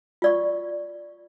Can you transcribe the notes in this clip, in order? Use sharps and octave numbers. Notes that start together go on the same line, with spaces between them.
F4 D5 C#6